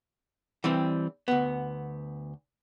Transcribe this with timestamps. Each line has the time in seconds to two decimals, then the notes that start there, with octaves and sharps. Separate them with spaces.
0.64 E3 G3 C4
1.28 D2 B3